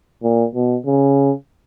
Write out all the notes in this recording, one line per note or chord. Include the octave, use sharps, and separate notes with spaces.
A#2
B2
C#3